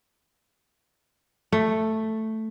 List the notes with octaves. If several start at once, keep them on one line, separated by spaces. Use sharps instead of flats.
A3